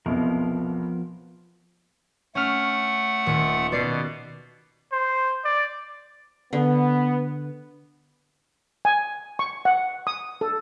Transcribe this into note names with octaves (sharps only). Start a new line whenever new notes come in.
B1 E2 C3 F3 B3 A#4
A3 C#4 F#5 F6
D#1 D#6 C#7
B2 B3 D5 C7
C5
D5
D3 B3
G#5
C#6
F#5
D#6
A4